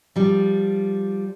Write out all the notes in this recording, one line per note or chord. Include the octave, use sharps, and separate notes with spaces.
F3 G3